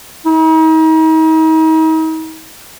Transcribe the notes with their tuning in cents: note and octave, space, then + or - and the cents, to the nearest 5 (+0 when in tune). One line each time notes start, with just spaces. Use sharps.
D#4 +40